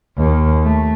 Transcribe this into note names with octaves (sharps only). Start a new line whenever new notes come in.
D#2
A3